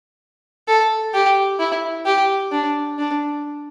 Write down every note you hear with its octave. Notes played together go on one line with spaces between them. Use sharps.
A4
G4
E4
G4
D4
D4